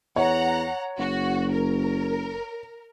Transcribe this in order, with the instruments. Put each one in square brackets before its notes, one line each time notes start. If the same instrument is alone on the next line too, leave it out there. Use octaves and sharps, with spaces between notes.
[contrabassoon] E2 [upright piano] C#5 [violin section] F#5 A#5
[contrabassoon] F#1 [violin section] F#4
[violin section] A#4